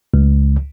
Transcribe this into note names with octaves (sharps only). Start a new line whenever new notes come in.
C#2